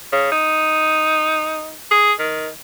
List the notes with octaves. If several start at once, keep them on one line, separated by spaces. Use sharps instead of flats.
C#3
D#4
G#4
D#3